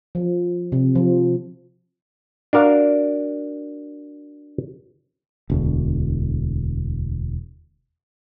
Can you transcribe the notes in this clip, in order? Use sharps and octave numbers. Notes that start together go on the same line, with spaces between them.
F3
C3
F3
D4 F#4 A#4 F5
E1 D2